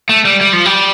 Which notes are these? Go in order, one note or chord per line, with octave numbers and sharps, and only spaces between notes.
A3
G3
G3
F3
G3